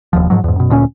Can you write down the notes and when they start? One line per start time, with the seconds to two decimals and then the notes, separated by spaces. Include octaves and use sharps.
0.13 E1 D#2 F3
0.30 G#2 F3 F#3
0.44 E2 G#2
0.56 F#2 B2
0.70 D2 A#2 C#4